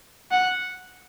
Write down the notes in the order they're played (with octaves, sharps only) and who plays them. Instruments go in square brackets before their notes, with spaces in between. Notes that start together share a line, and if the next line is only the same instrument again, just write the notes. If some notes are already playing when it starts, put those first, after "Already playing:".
[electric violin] F#5